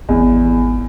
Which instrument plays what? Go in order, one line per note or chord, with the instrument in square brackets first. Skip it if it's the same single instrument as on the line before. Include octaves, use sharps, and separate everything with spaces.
[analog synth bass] G#1 [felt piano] E2